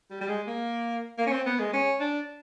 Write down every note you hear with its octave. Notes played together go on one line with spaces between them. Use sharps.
G3
G3
G#3
A#3
A#3
C#4
C4
B3
G#3
C#4
D4